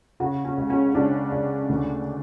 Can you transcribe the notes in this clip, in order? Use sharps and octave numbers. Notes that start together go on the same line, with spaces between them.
C#3 F#4
C#4
C#2
C#4
C#2 D4
C#2
D2